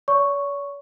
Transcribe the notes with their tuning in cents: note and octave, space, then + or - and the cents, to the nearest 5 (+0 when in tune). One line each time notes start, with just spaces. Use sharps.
C#5 +45 C#6 +0